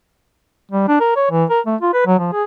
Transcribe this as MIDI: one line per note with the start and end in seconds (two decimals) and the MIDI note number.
0.71 0.87 55
0.88 0.96 62
1.00 1.11 70
1.16 1.27 73
1.31 1.45 52
1.50 1.60 70
1.66 1.76 57
1.81 1.93 65
1.94 2.03 71
2.06 2.18 54
2.19 2.30 53
2.33 2.44 68